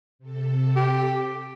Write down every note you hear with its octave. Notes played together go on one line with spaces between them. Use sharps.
C3 A4
G4